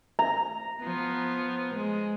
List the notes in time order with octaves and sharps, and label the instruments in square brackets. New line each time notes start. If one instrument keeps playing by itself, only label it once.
[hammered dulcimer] A#5
[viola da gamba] F3 B3
G#3